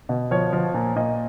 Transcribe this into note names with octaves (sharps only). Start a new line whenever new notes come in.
B2
F3 C#5
F3
A#2
A#2 D#5